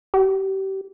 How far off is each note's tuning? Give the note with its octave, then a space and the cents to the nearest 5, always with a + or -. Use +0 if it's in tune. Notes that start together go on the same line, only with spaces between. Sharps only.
G4 -30